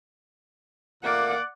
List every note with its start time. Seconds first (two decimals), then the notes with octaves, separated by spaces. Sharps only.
1.04 A#2 A3 A#3 D5 F#5